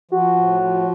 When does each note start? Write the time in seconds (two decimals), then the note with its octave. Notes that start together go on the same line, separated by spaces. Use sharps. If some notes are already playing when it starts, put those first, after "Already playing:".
0.11 F3 F#4
0.36 A2
0.60 F3